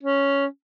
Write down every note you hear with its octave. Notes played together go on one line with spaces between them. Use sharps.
C#4